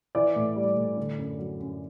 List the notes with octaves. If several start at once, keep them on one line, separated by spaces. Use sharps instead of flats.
E3 D5 D6
A2
G3
A2
D3
F#2
F#3
F#2